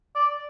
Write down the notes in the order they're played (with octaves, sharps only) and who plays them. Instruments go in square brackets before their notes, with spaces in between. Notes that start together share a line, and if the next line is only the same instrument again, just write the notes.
[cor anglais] D5